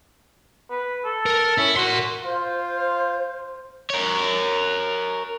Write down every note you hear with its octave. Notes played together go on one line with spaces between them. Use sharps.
B4
A4
A#4
C#4 E4
F#4 A#4 C6
F4 C5
A#4 C#5